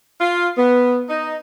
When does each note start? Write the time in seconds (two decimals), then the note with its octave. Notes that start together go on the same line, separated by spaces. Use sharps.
0.21 F4
0.57 B3
1.08 D#4